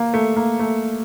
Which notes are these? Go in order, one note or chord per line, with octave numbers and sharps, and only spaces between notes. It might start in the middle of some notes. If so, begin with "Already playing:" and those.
Already playing: A#3
A3
A#3
A3